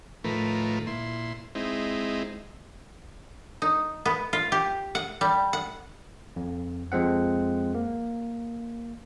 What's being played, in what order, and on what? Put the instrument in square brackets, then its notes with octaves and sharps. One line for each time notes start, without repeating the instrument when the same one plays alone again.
[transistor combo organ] A2 D#3 F3 A3 A#4 B4
A#2 E4 C6
G#3 C4 D#4 E4
[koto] D#4
B3
F4
G4
F#5
G3
F#5
[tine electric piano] F2
F2 F3 G#3 C4 F#5
A#3